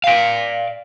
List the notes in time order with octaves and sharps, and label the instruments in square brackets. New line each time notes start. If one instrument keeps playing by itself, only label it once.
[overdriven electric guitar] D5 F5